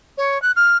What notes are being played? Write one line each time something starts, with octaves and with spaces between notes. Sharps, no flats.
C#5
F#6
F6